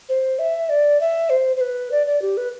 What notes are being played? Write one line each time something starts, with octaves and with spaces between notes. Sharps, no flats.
C5
E5
D5
E5
C5
C5
B4
D5
D5
G4
B4